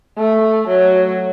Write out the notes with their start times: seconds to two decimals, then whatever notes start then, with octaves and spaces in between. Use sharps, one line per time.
0.18 A3
0.67 F#3